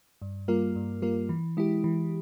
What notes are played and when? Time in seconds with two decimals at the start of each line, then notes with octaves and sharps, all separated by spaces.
0.22 G2
0.48 G3 A#3 F4 A#4
0.76 G2
1.02 G3 A#3 F4 A#4
1.29 E3
1.57 G#3 E4 G4
1.84 E3